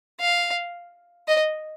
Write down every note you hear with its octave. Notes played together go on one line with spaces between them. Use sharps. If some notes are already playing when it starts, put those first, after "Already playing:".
F5
D#5